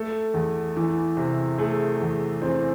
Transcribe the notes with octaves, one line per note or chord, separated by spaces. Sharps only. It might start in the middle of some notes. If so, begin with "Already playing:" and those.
Already playing: A3 A4
E2
E3
C3
A3 G#4
E2
E3 C4